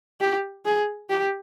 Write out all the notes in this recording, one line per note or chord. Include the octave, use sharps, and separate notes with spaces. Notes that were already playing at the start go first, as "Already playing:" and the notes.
G4
G#4
G4